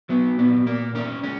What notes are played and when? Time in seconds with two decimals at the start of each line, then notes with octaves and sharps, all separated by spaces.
0.09 F#3 B3
0.38 A#2 B3
0.67 A#2 A#3
0.95 A#3 C#4
1.24 G#3 C#4